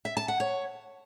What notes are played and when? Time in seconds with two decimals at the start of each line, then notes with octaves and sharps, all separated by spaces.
0.05 E5
0.17 A5
0.28 F#5
0.40 C#5